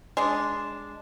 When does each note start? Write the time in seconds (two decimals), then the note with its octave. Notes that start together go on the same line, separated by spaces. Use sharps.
0.17 G#3 D4